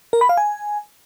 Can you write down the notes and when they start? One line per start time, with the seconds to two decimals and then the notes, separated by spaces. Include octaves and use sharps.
0.13 A#4
0.21 B5
0.29 F5
0.37 G#5